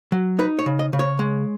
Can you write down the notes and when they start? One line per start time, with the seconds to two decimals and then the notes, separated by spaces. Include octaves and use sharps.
0.12 F#3
0.39 D#4 B4
0.59 C#5
0.66 C#3
0.79 D#5
0.93 C#3
0.99 C#5
1.19 G#3